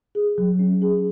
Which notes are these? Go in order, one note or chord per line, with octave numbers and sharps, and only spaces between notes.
G#4
F#3
C#4
G#4